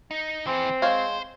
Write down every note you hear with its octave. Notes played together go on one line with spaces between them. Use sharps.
D#4
E3 C4 G#4
G#3 C5 C#5 F5